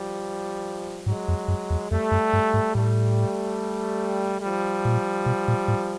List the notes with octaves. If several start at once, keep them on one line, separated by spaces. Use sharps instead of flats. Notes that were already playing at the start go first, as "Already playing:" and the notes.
Already playing: F3 G3
G#2 F#3 G#3
F2
F#2
E2
F2 G3 A3
F#2
G2
G#2
A2 G3 A3
F3 G3
A#2
B2
A#2
A2